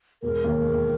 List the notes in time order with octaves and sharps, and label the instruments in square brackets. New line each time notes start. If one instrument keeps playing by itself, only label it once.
[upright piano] E1 [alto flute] A#4
[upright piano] D#2
E1